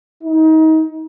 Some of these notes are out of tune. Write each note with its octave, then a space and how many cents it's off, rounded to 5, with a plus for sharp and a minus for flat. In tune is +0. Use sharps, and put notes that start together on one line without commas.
D#4 +30